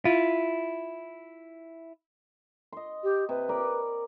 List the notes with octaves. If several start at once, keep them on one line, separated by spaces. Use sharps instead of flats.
E4 F4
D#5 C6
G4
C3 B4
A#4 D5 B5